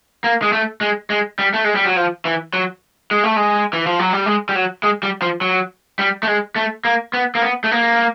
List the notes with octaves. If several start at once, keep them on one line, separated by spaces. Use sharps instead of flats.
A#3
G#3
A3
G#3
G#3
G3
A3
G#3
G3
F#3
F3
E3
F#3
G#3
A3
G#3
E3
F3
F#3
G3
G#3
G3
F#3
G#3
G3
F3
F#3
G3
A3
G#3
A3
A#3
B3
A#3
B3
A3
A#3